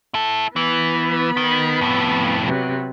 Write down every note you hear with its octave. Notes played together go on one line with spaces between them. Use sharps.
E4 A4
E3 B3 B5
D#3
F2 A2
C3 F#3 B3